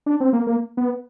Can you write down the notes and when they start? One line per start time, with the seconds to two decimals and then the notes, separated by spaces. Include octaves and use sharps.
0.06 D4
0.20 C4
0.33 A#3
0.47 A#3
0.77 B3